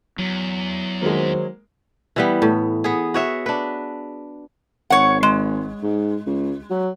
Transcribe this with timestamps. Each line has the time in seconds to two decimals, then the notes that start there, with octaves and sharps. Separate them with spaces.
0.19 E2 F#3
1.02 D#3 G#3 A#3 F#4 C5
2.16 E3 G3 B3
2.42 A2
2.84 B3 G#4
3.14 F#4 C#5 E5
3.46 D4 B4
4.90 G#1 C#5 F#5
5.23 G#3
5.82 G#2
6.26 C#2
6.70 F#3